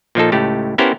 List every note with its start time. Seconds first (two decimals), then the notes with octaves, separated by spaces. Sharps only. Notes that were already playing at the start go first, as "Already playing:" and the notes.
0.15 A#2 F3 D#4 A4
0.32 C#2 A2 A3 G4
0.78 B3 C#4 E4 G4 A#4 C5